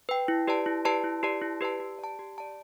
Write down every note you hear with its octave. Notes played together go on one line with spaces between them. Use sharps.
B4 G5
E4
G4 B4 D5 A5
E4
G4 B4 D5 A5
E4
G4 B4 D5 A5
E4
G4 B4 D5 A5
G4
D5 A5
G4
D5 A5